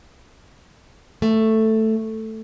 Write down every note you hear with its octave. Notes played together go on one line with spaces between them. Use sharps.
A3